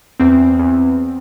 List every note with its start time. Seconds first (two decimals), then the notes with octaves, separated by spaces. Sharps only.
0.20 E2 C4
0.59 E2